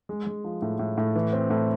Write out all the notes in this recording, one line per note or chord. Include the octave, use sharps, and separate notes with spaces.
G#3
G#3
F3
A2
A2
A2
E3
C4
A2